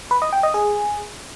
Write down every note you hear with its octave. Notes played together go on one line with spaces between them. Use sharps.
B4
D#5
G5
D#5
G#4